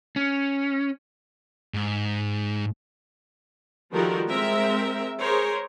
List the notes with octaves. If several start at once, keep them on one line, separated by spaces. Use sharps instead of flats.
C#4
G#2
D#3 F3 G3 F#4 A4 A#4
G#3 C4 A#4 E5
G#4 A#4 C5 C#5